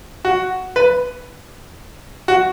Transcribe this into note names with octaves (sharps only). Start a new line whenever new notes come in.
F#4
B4
F#4